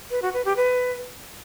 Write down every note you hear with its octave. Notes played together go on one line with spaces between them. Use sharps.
B4
F#4
B4
G4
B4